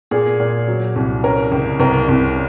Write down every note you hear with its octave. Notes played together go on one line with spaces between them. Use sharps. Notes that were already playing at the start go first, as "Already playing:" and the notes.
A#2 G#4
A#2
F#3
C2
C#4 A#4
C#2
C2 A#4
C2